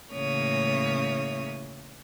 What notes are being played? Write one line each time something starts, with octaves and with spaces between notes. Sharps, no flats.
A2 C#3 E3 A#3 C#5 D#6